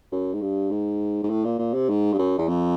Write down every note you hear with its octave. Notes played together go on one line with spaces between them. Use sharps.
F#2
G#2
G2
G#2
G#2
A2
A#2
A#2
C3
G#2
G2
F#2
E2
F2